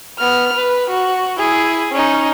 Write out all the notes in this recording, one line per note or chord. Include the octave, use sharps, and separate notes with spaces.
B3 F6
B4
F#4
E4 G#4
C#4 D#4